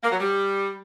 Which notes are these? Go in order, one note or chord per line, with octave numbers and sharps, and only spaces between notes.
A#3
F#3
G3